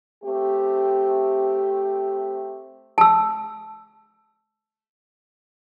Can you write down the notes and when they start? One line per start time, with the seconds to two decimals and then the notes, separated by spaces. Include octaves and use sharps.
0.24 A3 C4 G4
2.98 A5 E6